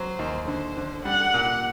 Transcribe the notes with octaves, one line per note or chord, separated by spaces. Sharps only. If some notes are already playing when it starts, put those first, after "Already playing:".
Already playing: F#3 C5
D#2
D3 C5
D3
G3 F#5
A#2